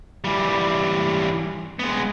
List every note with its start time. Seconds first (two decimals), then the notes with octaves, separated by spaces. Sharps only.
0.24 E3 G3
1.79 G#3 B3